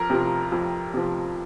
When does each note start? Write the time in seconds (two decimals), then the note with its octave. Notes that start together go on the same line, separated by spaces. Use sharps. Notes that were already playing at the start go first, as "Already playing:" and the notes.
Already playing: F2 A#4
0.10 C3 F3
0.52 F2
0.94 C3 F3